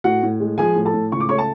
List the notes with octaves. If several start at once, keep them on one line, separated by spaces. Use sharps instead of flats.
A2 F#4 F#5
A2
G#3
F3 G#4 G#5
A2
A4 A5
A2
C#2 C#6
D6
A3 C#5 C#6
A5